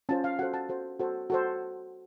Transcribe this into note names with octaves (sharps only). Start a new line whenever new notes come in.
C#4 F4 C5 A5
F5
F#4 A4 C5 F#5
A5
F#4 A4 C5
F#4 A4 C5
F#4 A4 C5